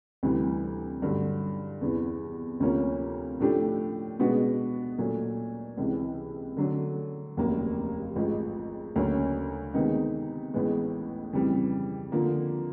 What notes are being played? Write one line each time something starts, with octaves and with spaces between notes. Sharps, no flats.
D2 C3 E3 G3
G2 D3 F#3
E2 C3 E3
D2 C3 F3 A#3 C#4
A2 F3 A3 D4 G4
B2 G#3 B3 D4 F#4
A#2 F#3 A3
C#2 C3 E3
D3 F#3 A3 D4
F1 D#2 C#3 F#3 A#3
A1 G#2 F3
D2 C#3 F#3 A#3 C#4
C3 D#3 G#3 B3 D#4
A1 A2 E3 G#3 B3
F2 C#3 E3 G3
D3 F3 A#3